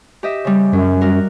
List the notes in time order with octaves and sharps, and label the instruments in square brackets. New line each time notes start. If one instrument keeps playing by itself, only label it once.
[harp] G4 D#5 E5
C#3 G3
[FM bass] F#2 [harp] F#3
[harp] G3 F#4 A#4